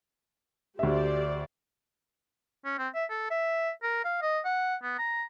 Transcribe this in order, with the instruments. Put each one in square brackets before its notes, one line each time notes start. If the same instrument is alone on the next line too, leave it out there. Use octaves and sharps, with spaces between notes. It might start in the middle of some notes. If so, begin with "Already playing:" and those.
[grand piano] D2 E5 [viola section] G4 C5 D5
[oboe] C#4
C4
E5
A4
E5
A#4
F5
D#5
F#5
B3
A#5